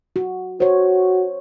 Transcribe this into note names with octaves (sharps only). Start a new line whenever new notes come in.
F#4
F#4 C5 C#5